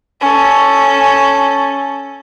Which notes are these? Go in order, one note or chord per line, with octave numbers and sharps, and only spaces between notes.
C#4 A4